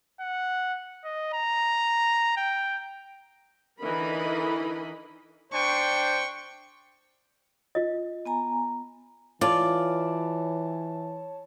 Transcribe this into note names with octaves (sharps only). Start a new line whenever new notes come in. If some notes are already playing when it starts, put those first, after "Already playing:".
F#5
D#5
A#5
G5
D3 E3 D#4 A#4 D#5 B5
D4 C5 G5 C#6
F4 D#5
B3 G#5 A#5
E3 F4 C#5 D5 A5